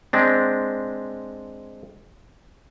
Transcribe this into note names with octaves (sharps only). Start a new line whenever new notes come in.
G#3 C4 D4